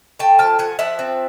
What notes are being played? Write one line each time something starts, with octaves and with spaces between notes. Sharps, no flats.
A3 G5 A5
F3 G5 A5
F3 F#5 G#5
F3 E5 F#5
C4